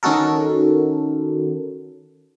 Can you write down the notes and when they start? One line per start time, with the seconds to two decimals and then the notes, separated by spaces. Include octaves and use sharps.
0.03 D#3 C#4 D#4 F#4 A4 A#4